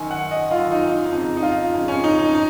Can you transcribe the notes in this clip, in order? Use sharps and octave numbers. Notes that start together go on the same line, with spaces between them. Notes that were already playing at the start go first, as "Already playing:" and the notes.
Already playing: F#2 D#3 G#5
F#5
D#5
F#2 D#3 F4
D#4
D#4
F2 C#3 D#4
D#4
F4
F2 C#3
C#4
D#4
D#4
D#4